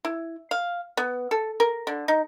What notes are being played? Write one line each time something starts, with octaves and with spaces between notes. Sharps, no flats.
E4
F5
B3
A4
A#4
D3
D#4